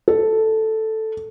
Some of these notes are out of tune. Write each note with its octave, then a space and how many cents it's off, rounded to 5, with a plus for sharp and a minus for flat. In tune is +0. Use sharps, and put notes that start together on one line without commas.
A4 +0